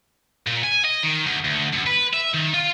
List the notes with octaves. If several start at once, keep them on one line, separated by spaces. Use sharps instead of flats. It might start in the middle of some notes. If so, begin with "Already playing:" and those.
A#2
G#5
D#5
D#3
D2
D2
F#2
B4
E5
D#3
F4